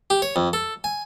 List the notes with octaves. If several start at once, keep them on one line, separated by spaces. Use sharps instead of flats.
G4
C#5
F2
A4
G#5